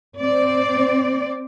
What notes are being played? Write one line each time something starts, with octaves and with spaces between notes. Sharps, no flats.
C4 D5